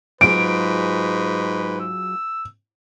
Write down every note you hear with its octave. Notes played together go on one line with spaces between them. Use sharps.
G#2 F#3 F4 G#4 B4 D7
E6